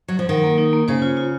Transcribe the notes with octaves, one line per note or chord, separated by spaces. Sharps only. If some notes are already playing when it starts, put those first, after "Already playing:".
F#3
F3
D#3 F#3
A#3
D#4
A#3
C#3 C5
F4
F4